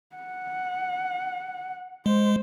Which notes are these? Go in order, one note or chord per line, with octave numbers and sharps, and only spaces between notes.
F#5
G#3 C5